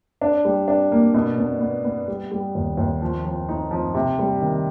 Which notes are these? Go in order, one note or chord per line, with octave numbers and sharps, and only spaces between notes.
D4
G3
D4
A#3
B2
B2
B3
B3
G3
G3
D#2
D#2
F3
F3
D#4
F3
C3
G3
D#3